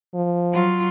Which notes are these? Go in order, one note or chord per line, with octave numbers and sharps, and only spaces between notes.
F3
F#3 F4